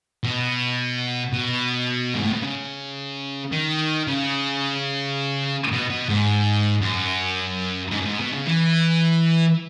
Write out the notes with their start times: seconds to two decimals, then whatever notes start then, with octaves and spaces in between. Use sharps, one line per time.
0.23 B2
1.33 B2
2.15 G#2
2.23 A2
2.33 B2
2.43 C#3
3.52 D#3
4.07 C#3
5.72 B2
5.90 B2
6.09 G#2
6.81 F#2
7.91 G#2
8.01 F#2
8.05 G#2
8.19 B2
8.33 C#3
8.46 E3